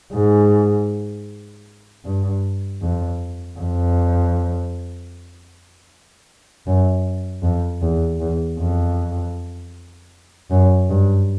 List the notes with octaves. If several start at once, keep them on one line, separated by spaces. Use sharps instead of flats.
G#2
G2
F2
F2
F#2
F2
E2
E2
F2
F#2
G2